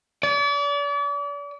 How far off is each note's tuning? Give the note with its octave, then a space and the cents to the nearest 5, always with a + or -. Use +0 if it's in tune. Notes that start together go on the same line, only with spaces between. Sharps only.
D5 -40